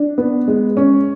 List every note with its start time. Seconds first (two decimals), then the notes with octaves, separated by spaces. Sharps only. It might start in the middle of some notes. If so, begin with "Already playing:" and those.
Already playing: D4
0.18 B3
0.48 G#3
0.77 C#4